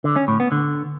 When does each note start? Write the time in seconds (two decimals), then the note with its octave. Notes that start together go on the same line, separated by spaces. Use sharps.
0.04 D3
0.16 C#4
0.28 A2
0.40 B3
0.52 D3